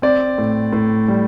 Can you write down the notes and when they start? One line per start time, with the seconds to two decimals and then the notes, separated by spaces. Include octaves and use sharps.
0.02 C4 D5
0.38 A2
0.73 A2
1.08 G3